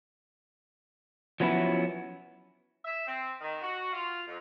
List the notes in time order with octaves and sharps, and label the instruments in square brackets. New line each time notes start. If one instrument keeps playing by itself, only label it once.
[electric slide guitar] F3 F#3 B3 C#4 E4
[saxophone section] E5
C4
D#3
F#4
F4
F2